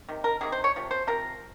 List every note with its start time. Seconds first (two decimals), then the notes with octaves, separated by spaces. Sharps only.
0.08 C3 D#3
0.24 A#4
0.41 C3 D#3 A#3 G#4
0.52 C5
0.64 C#5
0.76 C3 F3
0.91 C5
1.07 C3 F3 A#4